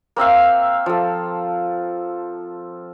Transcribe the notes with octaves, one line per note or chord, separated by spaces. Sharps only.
A#3 C4 E5 F5
F3 A4